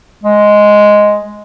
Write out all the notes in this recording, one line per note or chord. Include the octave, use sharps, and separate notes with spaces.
G#3